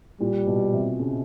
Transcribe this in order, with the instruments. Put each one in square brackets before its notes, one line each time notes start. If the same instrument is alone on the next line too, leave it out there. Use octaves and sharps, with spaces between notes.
[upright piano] A#2 [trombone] G3
[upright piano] B2
C3
C#3